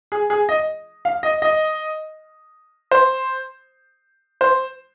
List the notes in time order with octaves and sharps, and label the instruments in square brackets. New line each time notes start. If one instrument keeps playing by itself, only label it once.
[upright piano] G#4
G#4
D#5
F5
D#5
D#5
C5
C5